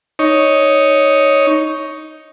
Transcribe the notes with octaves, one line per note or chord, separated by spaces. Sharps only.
D#4 C#5